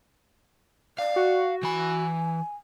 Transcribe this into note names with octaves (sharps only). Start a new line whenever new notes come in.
D5 F5
F#4
E3 G#5 B5